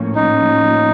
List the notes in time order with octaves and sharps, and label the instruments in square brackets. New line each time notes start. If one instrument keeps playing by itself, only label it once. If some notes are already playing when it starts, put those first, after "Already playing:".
Already playing: [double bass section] A2 F3 A#3 C#4
[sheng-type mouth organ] D#4